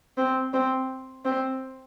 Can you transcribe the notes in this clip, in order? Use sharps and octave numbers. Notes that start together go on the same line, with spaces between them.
C4
C4
C4